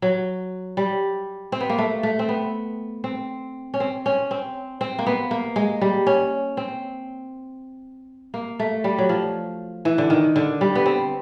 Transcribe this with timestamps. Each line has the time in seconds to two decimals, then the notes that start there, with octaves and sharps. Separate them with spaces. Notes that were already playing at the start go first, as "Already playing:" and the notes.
0.02 F#3
0.77 G3
1.52 C4
1.60 B3
1.70 A#3
1.78 A3
2.03 A3
2.19 C4
2.29 B3
3.04 C4
3.74 C#4
3.80 C4
4.06 C#4
4.31 C4
4.81 C4
4.99 A#3
5.06 B3
5.31 A#3
5.56 G#3
5.81 G3
6.07 C#4
6.57 C4
8.34 A#3
8.59 A3
8.84 G3
8.98 F#3
9.09 F3
9.85 E3
9.98 D3
10.10 D#3
10.36 D3
10.61 G3
10.75 B3
10.86 C4